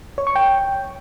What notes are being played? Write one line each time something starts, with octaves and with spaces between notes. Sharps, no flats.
C#5
C#6
G5